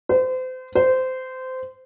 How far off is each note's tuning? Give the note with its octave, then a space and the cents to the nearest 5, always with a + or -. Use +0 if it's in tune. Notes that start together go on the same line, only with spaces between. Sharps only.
C5 -35
C5 -20